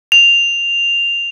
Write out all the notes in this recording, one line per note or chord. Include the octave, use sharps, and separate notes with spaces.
F7